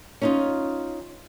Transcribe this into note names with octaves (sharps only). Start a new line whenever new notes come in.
C#4 D#4 F4